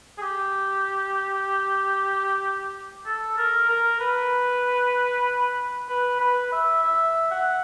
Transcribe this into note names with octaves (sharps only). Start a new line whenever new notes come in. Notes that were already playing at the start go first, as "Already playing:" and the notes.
G#4
G4
A4
A#4
A#4
B4
B4
B4
E5
E5
F#5